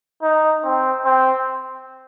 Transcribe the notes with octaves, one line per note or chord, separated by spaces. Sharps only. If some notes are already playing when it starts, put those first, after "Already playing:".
D#4
C4
C4